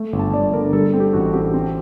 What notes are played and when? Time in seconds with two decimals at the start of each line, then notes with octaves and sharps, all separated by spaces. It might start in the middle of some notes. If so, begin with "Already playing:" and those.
Already playing: A3
0.13 G1
0.19 A5
0.33 G1 D5
0.53 D3 A#4
0.73 G3 A4
0.87 A4
0.94 C4
1.00 G4
1.13 A1 F#4
1.33 C4 G4
1.54 C4